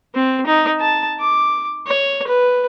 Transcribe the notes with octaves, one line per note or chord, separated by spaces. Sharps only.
C4
D#4
A5
D6
C#5
B4